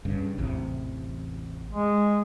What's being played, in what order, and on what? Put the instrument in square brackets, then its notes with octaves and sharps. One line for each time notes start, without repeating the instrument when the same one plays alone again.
[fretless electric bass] G2 C#3
A1 E2 C3
[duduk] G#3